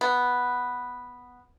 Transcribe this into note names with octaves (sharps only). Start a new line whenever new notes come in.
B3